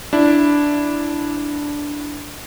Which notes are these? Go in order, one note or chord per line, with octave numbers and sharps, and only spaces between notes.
D4 E4